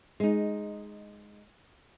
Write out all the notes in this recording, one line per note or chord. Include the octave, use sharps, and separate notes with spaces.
G#3 D#4